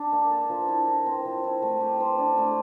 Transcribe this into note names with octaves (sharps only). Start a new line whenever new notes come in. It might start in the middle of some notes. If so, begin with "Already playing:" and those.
Already playing: D4
A#3
A4
F3
E4
A#4
C4
F3
E4
A3
G4
C5
D4
A3